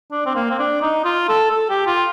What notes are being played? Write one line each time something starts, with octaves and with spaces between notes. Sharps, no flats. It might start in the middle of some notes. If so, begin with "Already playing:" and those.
D4
C4
A#3
C4
D4
D#4
F4
A4
A4
G4
F4